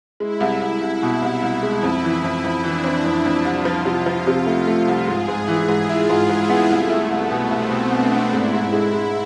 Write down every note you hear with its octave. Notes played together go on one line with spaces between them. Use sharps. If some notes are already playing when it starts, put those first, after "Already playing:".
G#3 E4
C2
C2
C2
B2
C2
C2
G#3
F2 E4
E3
F2
F2
E3 D4
C4
F2 E4
F2
C2 F4
F3
C3
F3
C3
A3
A3
C2
G#2 G#4
G#2
E3 G#4
G#2
E4 F4
G#2
G#2 E4
B3
C2 A3
E4
C2 B3
B2
C2 C4
B2
B2 D4
B3
G#2 E4
G#2
G#3
G#3